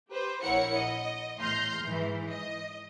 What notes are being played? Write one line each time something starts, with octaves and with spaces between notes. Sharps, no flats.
G4 B4 C5
A#1 E4 A#4 C#5 F#5 C#7
D#5
E2 A2 C6 F6 G6 A#6
G#2 E3
D#5